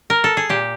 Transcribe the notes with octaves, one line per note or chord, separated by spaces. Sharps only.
A#4
A4
G#4
A#2 G4